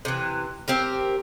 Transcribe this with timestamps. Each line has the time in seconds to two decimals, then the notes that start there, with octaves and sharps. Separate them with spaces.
0.05 C3 E3
0.68 C4 G4 A#4